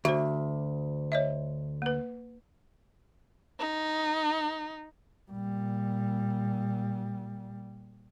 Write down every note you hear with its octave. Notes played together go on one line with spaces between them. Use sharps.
D2 F#4 C5
C#5 D#5 E5
A#3 B4
D#4
A#2 G3